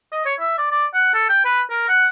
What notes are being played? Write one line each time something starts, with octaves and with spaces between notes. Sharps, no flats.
D#5
C#5
E5
D5
D5
F#5
A4
G5
B4
A#4
F#5